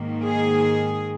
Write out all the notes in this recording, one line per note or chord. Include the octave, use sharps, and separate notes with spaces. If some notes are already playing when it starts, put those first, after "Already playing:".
Already playing: G#2 D#3 A#3
G#4